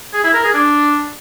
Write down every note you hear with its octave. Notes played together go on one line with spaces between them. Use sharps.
G#4
E4
A#4
G#4
D4